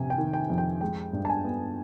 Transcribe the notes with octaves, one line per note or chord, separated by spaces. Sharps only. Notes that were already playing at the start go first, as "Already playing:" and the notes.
Already playing: F2 C3 G#5
G5
D#3
G5
F2
G5
G#3 G5
G2
A5
G#5
B3